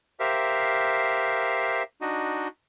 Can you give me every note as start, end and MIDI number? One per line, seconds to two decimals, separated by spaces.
0.20 1.83 67
0.20 1.83 70
0.20 1.83 72
0.20 1.83 76
0.20 1.83 77
2.01 2.48 62
2.01 2.48 63
2.01 2.48 66
2.01 2.48 75